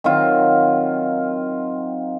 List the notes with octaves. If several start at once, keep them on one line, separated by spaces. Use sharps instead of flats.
D#3 F#3 C4 F4